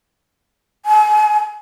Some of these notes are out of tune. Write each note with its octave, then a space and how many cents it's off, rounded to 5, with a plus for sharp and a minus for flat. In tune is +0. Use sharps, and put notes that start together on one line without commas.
G#5 +40